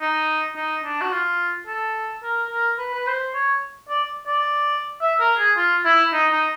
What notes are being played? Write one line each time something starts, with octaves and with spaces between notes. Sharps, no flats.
D#4
D#4
D4
F#4
F4
A4
A#4
A#4
B4
B4
C5
C#5
D5
D5
E5
A#4
G#4
F4
E4
D#4
D#4